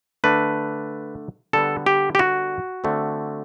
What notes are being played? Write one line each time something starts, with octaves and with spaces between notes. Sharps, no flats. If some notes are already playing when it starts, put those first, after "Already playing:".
D3 A3 D4 B4
D3 G3 B3 A4
G4
G4
F#4
D3 A3 C4